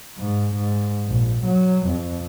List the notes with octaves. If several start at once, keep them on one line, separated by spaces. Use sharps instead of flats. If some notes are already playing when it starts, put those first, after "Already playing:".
G#2
G#2
A#1
F#3
F2